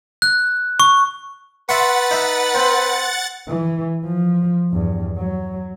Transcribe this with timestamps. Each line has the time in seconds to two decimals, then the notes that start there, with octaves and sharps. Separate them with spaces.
0.22 F#6
0.80 C#6
1.69 B4 E5 F#5 C6 C#6 A6
2.11 D#4 E5
2.55 C4
3.49 E3
4.05 F3
4.72 E2 G2
5.18 F#3